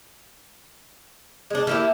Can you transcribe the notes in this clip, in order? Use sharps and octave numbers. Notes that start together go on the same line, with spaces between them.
G#3 D4
A3 A#3 E4 G4